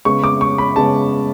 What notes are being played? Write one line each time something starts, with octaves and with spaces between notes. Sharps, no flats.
C#3 G#3 B3 C#6
D6
C#6
B5
C#3 G#3 B3 A5